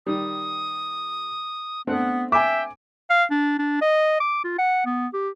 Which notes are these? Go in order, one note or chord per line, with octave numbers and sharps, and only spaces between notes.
D#3 G3 D#6
A3 B3 C4 D4 F#5
E5 G5 G#5 D6
F5
D4
D4
D#5
D6
F4
F#5
B3
G4